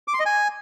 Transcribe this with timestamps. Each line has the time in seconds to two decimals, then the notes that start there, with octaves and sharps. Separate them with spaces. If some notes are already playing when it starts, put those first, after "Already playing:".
0.08 D6
0.14 C6
0.20 D#5
0.26 G#5